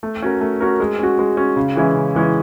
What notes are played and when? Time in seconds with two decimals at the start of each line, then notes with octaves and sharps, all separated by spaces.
0.03 A3
0.22 C#4 F#4 A#4
0.41 A3
0.61 C#4 F#4 A#4
0.80 G#3
0.99 C#4 F#4
1.19 G#3
1.37 C#4 F#4
1.56 C#3
1.75 E3 G#3 C#4 E4
1.95 C#3
2.15 E3 G#3 C#4 E4